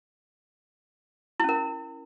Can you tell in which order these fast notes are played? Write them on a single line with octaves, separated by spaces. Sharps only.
E4 C#4 A#4